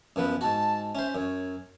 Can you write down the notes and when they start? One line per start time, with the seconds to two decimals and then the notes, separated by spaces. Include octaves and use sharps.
0.16 F#2 F3 B3 B4
0.41 G#2 F#4 A5
0.95 C#4 C5 E5
1.15 F#2 C#5